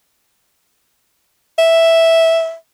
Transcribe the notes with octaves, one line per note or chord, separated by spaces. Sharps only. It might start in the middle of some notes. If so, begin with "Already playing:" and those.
E5